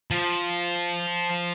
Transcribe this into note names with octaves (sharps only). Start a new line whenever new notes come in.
F3